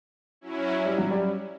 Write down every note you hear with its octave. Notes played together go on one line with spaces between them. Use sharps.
F#3 C#4 E4
G3
F#3
G3